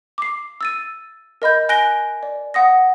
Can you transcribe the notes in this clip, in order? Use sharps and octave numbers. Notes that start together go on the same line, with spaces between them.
D6 C7
E6 A6 D#7
A#4 D#5 B5 G6
G#5 F#6 A#6 D7 G7
D5
F#5 D#6 A#6